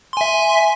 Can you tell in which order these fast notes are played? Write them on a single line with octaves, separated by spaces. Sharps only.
C6 G#5 E5